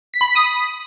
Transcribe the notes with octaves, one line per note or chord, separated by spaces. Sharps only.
B6
B5
B6
D#6